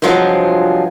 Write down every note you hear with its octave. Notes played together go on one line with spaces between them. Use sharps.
G2 C3 F3 F#3 G#3 F4